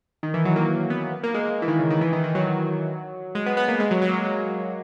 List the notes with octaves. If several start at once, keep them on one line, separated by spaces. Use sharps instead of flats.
D#3
E3
F#3
A#3
B3
A#3
G#3
A#3
E3
D#3
C#3
D#3
E3
D#3
D#3
F#3
G#3
B3
B3
A#3
G#3
F#3
F#3
A#3
G#3
F#3